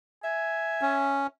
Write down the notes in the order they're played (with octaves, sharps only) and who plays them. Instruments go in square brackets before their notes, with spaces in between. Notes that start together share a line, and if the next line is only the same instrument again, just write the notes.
[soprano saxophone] E5 [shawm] G#5
[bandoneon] C#4